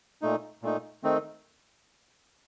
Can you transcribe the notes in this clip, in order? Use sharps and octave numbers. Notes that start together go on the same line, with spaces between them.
A#2 A3 D#4
A#2 A3 D#4
D#3 A3 C4 D#4